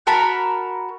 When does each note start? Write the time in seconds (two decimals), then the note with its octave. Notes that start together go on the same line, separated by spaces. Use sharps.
0.07 F#4 A#4 A5 B5